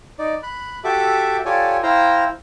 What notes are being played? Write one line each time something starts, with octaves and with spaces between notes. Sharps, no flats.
D#4 D5
B5 F#6
F#4 G4 A4 E5 D6
F4 G4 A4 C#5 D5 G#5
E4 C5 F5 G5 A#5